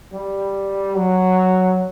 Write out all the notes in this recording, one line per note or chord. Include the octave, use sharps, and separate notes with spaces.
G3
F#3